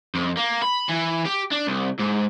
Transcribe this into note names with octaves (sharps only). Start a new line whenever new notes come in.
F2
A#3
B5
E3
G4
D4
C2
G#2